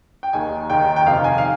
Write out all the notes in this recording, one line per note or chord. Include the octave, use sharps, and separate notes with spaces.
G5
D#2 D#3 G#5
D#2 D#3 G5
G5
F2 C3 D#3 F5
G#5
F5